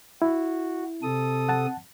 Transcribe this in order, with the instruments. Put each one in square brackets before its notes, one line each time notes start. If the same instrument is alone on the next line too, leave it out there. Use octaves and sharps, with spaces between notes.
[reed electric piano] E4 [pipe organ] F#4
[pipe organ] C3 A4 D#6
[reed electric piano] F#5 A5